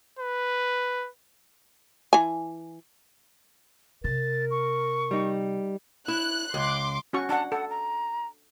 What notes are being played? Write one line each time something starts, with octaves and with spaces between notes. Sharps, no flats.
B4
E3 G#5
C3 A#4 A6
C#6
G3 D#4
E4 F#6
C#2 C6 D6
C#4 F#4 C#6
D4 F#5 A5
A4 F#5
A#5